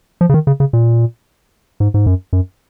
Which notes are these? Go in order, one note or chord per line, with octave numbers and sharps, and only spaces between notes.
F3
C#3
D#3
C#3
C#3
A#2
G#2
G#2
F#2
F#2